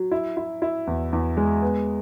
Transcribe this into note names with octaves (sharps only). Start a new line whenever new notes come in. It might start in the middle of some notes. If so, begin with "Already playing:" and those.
Already playing: F#3
E4
E4
E4
E2
E2
G#3
B3